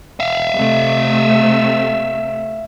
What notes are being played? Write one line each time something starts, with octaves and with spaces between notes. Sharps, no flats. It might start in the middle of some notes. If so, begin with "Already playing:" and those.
E5 F5
C3 A3